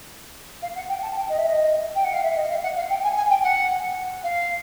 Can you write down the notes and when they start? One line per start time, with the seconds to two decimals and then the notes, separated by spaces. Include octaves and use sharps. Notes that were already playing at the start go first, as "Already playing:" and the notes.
0.62 F5
0.75 F#5
0.89 G5
1.02 A5
1.16 G5
1.29 D#5
1.38 E5
1.47 D#5
1.95 G5
2.04 F#5
2.13 F5
2.23 E5
2.36 D#5
2.50 F5
2.63 F#5
2.76 F5
2.89 G5
3.03 G#5
3.16 G#5
3.30 G5
3.43 F#5
4.23 F5